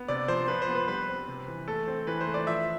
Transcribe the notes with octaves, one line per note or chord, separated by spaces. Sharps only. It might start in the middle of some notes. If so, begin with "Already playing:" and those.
Already playing: B3
C3 D5
F3 C5
F3 B4
C5
B3
B4
G3 B4
C4
C3
E3
A3 A4
C4
E3 B4
C5
A3
D5
F3 E5